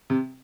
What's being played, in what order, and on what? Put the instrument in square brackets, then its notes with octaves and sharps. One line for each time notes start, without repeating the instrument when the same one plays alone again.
[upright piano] C3